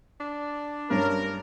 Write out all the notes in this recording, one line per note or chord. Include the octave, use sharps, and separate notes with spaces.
D4
G2 C#4 A#4